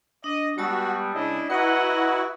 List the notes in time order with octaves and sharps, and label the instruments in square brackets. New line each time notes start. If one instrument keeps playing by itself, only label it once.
[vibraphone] D4 [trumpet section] D#5
[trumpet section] G3 B3 [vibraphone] G#3 A5 E6 [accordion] F#4
[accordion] C#3 [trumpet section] D4 E4 D#5
[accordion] E4 F#4 [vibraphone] B4 A#5 [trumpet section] D#5 F#5